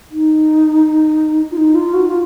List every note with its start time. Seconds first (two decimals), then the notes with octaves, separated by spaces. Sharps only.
0.11 D#4
1.51 F4
1.57 D#4
1.75 F4
1.94 F#4
2.05 F4